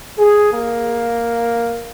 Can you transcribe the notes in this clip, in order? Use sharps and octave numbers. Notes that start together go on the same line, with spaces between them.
G#4
A#3